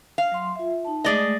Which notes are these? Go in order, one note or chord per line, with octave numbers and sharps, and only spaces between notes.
F5
F#3 C6
F4 E5
D#4 A5
G#3 A3 G#4 D5 D#5